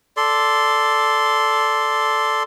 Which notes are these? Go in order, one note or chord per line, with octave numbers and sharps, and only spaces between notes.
A4 D5 C6